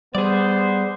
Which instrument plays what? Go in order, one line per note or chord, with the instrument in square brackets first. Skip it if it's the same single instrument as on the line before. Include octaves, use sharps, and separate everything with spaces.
[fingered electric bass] G3 [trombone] B3 [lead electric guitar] G#4 D5 [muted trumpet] C5